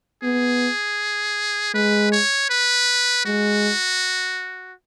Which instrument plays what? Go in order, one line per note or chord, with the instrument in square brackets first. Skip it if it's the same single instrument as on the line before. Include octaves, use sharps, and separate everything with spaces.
[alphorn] B3 [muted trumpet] G#4
[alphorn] G#3 [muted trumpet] B4
[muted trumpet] C#5
B4
[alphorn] G#3 [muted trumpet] F#4